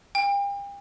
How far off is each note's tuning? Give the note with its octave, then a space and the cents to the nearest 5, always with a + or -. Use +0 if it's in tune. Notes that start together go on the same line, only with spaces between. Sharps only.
G5 +40